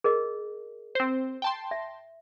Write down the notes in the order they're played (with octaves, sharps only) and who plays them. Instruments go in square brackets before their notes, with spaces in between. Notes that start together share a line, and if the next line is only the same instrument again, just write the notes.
[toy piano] G#4 A#4 D#5
[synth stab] C4 C5
G5 A5 C6
[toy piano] E5